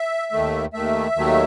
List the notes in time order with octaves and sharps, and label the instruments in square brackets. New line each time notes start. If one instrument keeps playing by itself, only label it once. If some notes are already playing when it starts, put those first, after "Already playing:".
Already playing: [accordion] E5
D#2 D#3 A3
D#2 D#3 A3 E5
D#2 D#3 F#3 A3